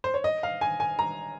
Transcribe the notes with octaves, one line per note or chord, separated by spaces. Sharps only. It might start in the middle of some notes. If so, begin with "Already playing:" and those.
C5
C#5
D#5
F5
G#5
G#5
A#5